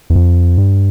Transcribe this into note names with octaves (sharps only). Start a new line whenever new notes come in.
E2
F2
G2